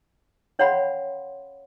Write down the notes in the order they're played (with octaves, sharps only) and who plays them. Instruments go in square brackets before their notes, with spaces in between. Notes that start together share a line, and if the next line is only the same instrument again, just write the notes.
[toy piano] C#4 C#5 F5 F#5 B5 C6